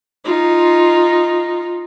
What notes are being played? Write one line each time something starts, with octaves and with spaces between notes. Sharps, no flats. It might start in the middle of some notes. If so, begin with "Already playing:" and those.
D#4 F4